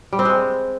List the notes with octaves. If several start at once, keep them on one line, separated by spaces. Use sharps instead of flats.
G3
C4
G#3